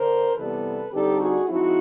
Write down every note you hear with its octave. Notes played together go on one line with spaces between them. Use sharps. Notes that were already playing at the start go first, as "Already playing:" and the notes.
Already playing: D3 A#4 C5
C3 E3 G3 B3 A4 B4
D3 G3 C4 D#4 G4 A4
F#4 G#4
F3 G#3 C4 D#4 E4 F#4